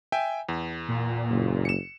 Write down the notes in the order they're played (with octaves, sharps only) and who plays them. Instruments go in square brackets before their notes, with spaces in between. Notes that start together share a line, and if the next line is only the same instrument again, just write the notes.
[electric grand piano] E5 G5 G#5
E2
[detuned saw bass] A#2
[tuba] F#1
[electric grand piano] C#7 E7